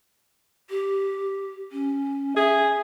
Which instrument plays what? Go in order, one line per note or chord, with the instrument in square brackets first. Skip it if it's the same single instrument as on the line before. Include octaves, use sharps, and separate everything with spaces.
[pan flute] G4
C#4
[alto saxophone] G#4 [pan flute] E5